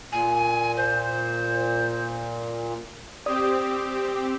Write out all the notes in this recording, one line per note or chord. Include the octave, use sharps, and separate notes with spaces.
A#2 G#5
C5
C4 G4 D5 D#6